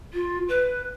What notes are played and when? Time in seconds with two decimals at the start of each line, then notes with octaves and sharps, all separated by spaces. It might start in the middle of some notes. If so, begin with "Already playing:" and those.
0.13 F4
0.48 B4